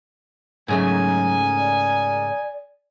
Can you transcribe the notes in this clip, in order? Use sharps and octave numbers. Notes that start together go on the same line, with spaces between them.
G#2 C#3 F#3 A3 A#4 D#5 G#5
D5